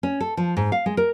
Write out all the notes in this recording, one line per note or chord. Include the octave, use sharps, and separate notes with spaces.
C#4
A4
F3
G#2
F5
G#3
A#4